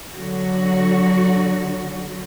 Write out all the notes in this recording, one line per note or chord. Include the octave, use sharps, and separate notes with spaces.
D3 F#3 F#4